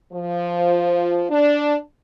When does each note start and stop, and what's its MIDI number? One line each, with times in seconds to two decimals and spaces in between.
0.13 1.25 53
1.30 1.78 62